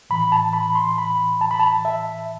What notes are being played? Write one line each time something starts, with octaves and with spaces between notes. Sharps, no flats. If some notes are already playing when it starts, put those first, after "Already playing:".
A2 E3 B5
A5
B5
C6
B5
A5
B5
A5
E5